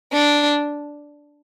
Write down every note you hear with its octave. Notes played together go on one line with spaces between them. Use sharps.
D4